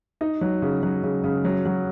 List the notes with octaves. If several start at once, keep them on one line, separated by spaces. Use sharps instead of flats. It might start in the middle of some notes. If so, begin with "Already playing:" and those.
D#4
F#3
C#3
F#3
C#3
C#3
F#3
F#3